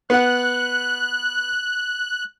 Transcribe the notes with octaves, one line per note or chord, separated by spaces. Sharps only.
B3 F#5 F#6